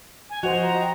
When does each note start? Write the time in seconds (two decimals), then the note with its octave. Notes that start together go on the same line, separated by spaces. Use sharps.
0.30 G#5
0.43 F3 F#4 C5 D#5 F7
0.62 A#5
0.81 G5